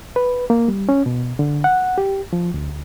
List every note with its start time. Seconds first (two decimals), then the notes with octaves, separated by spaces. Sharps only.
0.16 B4
0.50 A#3
0.68 G3
0.89 C#4
1.06 B2
1.39 D3
1.64 F#5
1.98 G4
2.33 F3
2.54 D2